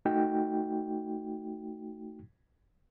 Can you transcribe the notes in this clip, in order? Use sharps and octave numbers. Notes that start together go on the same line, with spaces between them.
A3 D#4 F#4 G5